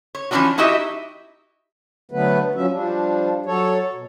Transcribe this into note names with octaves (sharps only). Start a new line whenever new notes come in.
C#5
E3 F3 G3 C#4 D4 F#4
D#4 E4 F#4 G4 D#5 E5
D3 F#3 A3 B3 B4
F3 F#3 C#4 E5
F3 G3 D4
F#3 A4 C#5
B2